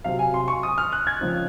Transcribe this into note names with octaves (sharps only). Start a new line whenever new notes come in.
C3 F#3 C4 F5
G#5
C6
C#6
D#6
F6
F#6
G#6
C#3 F3 C4 D#4